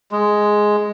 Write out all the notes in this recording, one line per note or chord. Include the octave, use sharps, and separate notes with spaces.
G#3